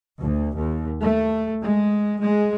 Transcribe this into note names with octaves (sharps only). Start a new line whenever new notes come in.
D2
D#2
A3
G#3
G#3